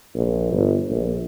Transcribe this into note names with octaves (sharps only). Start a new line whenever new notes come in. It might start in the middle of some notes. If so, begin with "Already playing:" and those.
A#1
G1
A#1